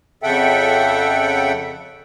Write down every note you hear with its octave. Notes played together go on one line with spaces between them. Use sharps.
F2 C#3 A4 E5 F#5 G5